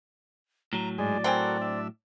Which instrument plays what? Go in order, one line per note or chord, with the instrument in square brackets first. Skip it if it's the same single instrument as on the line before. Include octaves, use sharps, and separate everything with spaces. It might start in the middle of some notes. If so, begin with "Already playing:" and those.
[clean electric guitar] A2 F#3 [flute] A#5
[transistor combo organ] G#2 G#3 [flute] D5
[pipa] C4 G5 G#5 [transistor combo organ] F#4 A4 A#4
[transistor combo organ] D4 E5